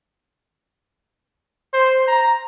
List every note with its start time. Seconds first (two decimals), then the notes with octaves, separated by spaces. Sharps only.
1.74 C5
2.08 A#5